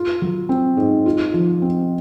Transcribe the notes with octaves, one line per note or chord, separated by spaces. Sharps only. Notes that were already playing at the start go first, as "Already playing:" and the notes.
Already playing: F4
F#3
C4
G#2
F4
F3
C4